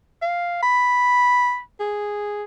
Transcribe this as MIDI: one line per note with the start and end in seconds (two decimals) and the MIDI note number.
0.22 0.61 77
0.63 1.59 83
1.80 2.43 68